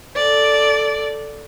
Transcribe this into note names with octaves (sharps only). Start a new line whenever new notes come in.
A4 D5